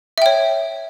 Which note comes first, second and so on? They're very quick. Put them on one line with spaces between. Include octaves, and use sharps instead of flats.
E5 G5 C#5